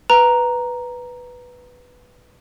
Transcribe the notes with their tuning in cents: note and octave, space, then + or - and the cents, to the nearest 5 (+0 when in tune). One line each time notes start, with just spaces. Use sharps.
B4 +0 A#5 +0